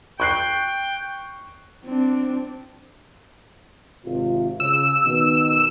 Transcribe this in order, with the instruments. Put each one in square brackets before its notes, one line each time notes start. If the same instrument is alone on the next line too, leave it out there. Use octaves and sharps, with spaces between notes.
[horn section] G5 [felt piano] C#6 F#6 C7
[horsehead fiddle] C4 D4
[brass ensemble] G#1 C3 F4
[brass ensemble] C#3 [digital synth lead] E6
[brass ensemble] B2 D#3